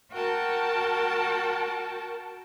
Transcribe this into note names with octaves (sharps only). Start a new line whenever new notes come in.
F#4 A#4 G5 A5